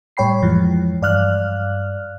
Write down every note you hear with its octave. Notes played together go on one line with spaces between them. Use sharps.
A2 G3 C#5 G5 B5 C7
F2 E3 F3 G#3
G2 D5 F5 F6 F#6